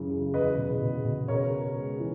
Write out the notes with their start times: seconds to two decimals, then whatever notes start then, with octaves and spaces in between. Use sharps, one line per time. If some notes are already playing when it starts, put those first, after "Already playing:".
Already playing: F#2 C#3 E3
0.10 C#3
0.34 E2 B4 D#5
0.57 B2
0.81 B2
1.05 B2
1.28 C#3 A#4 C#5
1.52 C#3
1.75 G#3
1.99 E3